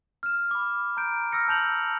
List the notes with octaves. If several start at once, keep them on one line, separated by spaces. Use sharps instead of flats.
F6 E7
B5 D6
A#5 G6 D7
E6 F6 A#6 C#7
A5 G6 F7 F#7